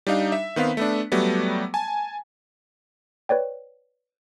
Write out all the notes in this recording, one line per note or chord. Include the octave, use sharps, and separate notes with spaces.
G3 D4 D#4 F5
E5
D#3 B3 C4 F5 B6
A3 B3 D4
F#3 G3 A3 B3
G#5 A5
B4 C#5 D5 G5